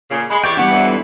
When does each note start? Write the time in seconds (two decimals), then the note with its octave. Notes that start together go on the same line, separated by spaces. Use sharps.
0.10 A#2 C#3
0.30 G#3 B5
0.44 E3 G4 D5 G5 C#6
0.57 G3 B3 D4 F#5
0.71 F2 E3